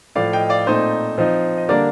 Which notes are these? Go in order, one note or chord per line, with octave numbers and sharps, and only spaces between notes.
A2 F3 A3 D5 F5
D#5 G5
D5 F5
A#2 A3 C4 D#4 C5 D#5
F3 C4 D#4
D#5
D3 G3 A#3 D4 A#4 D5